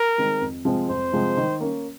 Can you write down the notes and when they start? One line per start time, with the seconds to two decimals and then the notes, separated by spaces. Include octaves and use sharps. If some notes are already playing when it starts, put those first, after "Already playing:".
Already playing: A#4
0.18 D#3 G#3 C4
0.41 F2
0.65 C3 F3 G#3 C4
0.89 F2 C5
1.12 C3 F3 G#3 C4
1.37 D#3
1.61 A#3 C#4